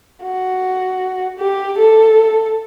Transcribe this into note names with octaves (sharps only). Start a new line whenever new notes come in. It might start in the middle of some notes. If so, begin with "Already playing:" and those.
F#4
G4
A4